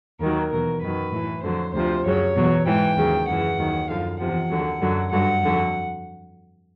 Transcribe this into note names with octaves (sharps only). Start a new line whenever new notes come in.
D#2 D#3 F#3 A#4
E2 B2 F#3 A#4
F#2 D#3 F#3 B4
A2 E3
F2 D3 F#3 C5
D2 C3 F3 C5
F#2 C#3 F#3 C#5
E2 B2 F#3
G#2 E3 G5
D#2 C#3 F#3
F#2 C#3 E3 F#5
D#2 D#3 F#3
F#2 D3 F3 F5
E2 C3 F3 F#5
D#2 D3 F#3
F#2 D3 F#3
G2 D3 F#3 F#5
F2 D3 F#3